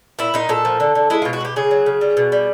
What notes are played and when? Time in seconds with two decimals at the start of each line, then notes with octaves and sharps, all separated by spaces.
0.19 A#2 E4
0.34 A#2 D#4
0.49 A#2 A4
0.65 F3
0.80 D3
0.95 D3
1.10 G#3 E4
1.22 B2 F4
1.33 F#4
1.41 B2 G4
1.56 C#3 G#4
1.71 F#3
1.86 C#3
2.01 G3
2.17 B2
2.32 G3